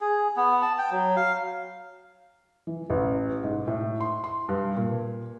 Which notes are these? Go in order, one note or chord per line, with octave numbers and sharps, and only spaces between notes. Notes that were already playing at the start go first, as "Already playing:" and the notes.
G#4
B3
A5
G5
F#3
F5
E3
A1
G#2
A2
C6
C6
G2
A#2